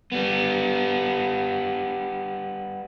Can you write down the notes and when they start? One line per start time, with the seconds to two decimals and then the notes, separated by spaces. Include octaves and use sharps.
0.12 G3 B3